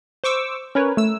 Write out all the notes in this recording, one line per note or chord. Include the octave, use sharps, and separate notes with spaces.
C5 C#6 D6 E6
C#4 A#4 B4 C#5
A3 E6